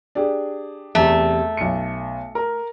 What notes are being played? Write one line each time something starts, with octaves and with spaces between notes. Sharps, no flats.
D4 G4 G#4
E2 C3 A3
B1 C#7
A#4